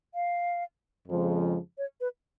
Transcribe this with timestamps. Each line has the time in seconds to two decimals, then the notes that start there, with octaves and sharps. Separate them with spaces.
0.14 F5
1.08 F2 C#3 F3 G#3
1.78 C#5
2.01 B4